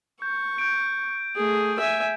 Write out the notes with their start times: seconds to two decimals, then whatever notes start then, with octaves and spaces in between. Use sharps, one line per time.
0.22 C#6 G6 G#6
0.58 G6 D7
1.36 A3 G#4
1.79 E5 G#5